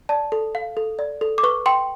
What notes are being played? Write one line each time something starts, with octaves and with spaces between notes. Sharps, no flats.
D5 A5
A4
F5
A4
D5
A4
D6
B4 C#6
G5 C6